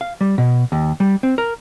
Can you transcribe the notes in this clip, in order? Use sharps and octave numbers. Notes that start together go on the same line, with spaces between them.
F5
G3
B2
D#2
G3
C4
A#4